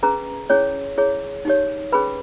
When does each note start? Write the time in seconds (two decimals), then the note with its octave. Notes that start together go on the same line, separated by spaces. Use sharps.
0.03 C#4 G#4 B4 A#5
0.50 C#4 E4 G#4 C#5
0.98 E4 G#4 C#5
1.45 D#4 G4 C#5
1.92 C#4 G#4 B4 B5